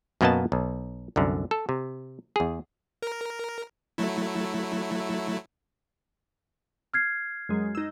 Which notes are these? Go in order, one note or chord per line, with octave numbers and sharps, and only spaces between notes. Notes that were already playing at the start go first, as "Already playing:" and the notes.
F#2 B2 A#3 B3 D#5 A5
B1
C2 F#2 D3
A4
C3
E2 G#4
A#4
F#3 A3 E4
F6 G#6 C7
F#2 G#3
D#4 E6